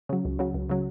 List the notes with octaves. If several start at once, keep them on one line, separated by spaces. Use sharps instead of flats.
C#3 F#3
C#2
C#3 F#3
C#2
C#3 F#3